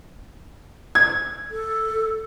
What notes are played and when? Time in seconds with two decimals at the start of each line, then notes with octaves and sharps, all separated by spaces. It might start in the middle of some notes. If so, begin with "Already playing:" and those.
0.95 G#6
1.51 A4